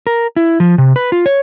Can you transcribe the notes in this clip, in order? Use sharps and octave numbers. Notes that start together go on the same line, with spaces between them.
A#4
E4
F3
C3
B4
F4
C#5